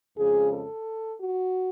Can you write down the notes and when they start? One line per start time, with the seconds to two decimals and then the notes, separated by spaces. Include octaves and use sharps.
0.17 F2 C#3 G#3 G#4
0.52 A4
1.21 F#4